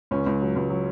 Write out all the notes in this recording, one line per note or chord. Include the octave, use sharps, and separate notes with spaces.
C#2 C#4
C#2
F#3
C#2
F#3